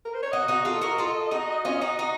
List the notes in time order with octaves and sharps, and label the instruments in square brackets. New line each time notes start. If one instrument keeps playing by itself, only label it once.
[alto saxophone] A#4
C5
C#5
[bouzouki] D#4 F#4 [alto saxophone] D#5
[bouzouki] D#4 F#4
F4 A4
F#4 A#4
F4 A4
D#4 F#4
C#4 F4
D#4 F#4
D#4 F#4